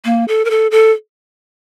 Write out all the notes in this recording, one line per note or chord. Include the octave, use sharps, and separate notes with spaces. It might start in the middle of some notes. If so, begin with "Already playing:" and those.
A#3
A4
A#4
A4
A4